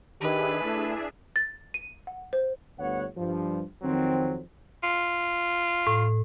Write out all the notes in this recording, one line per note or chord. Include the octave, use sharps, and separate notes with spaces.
D#3 D4 G4 G#4 B4 E5
A3 E4
A6
D#7
F#5
C5
G1 D2 B3 C#5 F#5
G2 F3
F2 D#3 F#3 C4
F4
A2